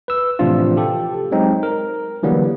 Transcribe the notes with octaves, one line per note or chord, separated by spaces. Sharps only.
B4 E6
A2 C3 E3 F3 D4 F4
G4 A4
F#3 G#3 C4 D#4
A#4
D3 E3 F#3 G3 A#3 B3